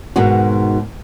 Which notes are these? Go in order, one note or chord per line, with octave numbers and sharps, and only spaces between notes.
G#2 B2 D#3 G#3 F#4